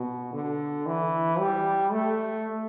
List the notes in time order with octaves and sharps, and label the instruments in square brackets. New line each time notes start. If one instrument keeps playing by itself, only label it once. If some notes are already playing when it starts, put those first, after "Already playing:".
Already playing: [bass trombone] B2
D3
E3
G3
A3